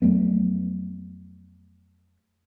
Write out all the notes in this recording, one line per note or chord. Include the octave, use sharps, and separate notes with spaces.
F2 F#3 A3 B3